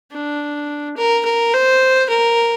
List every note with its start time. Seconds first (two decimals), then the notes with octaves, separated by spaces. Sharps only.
0.12 D4
0.96 A#4
1.25 A#4
1.53 C5
2.09 A#4